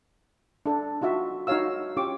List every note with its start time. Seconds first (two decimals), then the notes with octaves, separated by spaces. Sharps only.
0.66 D4 A4
1.01 D#4 F4 F#4 E5
1.47 D#4 F4 F#4 C#5 F5 E6
1.97 C#4 F4 G4 C#6 D6